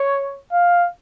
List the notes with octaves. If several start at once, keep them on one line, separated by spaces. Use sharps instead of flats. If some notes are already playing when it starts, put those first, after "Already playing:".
Already playing: C#5
F5